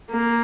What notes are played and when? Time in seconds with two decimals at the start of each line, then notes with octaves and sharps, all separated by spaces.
0.12 A#3